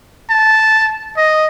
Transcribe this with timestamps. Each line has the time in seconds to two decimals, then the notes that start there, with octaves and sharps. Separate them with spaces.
0.30 A5
1.17 D#5